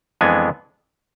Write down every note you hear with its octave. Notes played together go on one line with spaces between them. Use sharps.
F2 E3 G#3 B3 D4 G#5